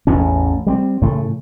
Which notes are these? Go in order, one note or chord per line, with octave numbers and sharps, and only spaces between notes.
A1 E2 A2 C#4
G3 A3 C4
A2 C#3 E3 A3